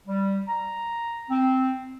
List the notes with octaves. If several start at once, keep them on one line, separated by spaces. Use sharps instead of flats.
G3
A#5
C4